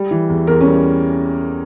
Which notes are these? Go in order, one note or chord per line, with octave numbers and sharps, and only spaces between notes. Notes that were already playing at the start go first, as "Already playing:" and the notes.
Already playing: G3
E3
E2
E2 A#4
C#4
G3